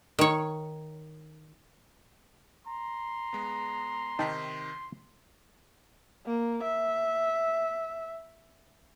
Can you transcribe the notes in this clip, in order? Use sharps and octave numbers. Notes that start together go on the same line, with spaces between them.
D#3 C#5
A#5 C6
G#3 B3
C3 D#3 D#4 G5 A5 B6
A#3
E5